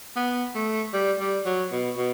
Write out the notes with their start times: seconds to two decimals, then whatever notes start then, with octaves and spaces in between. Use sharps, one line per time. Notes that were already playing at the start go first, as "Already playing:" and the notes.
0.16 B3
0.55 A3
0.93 G3
1.20 G3
1.46 F#3
1.72 B2
1.97 B2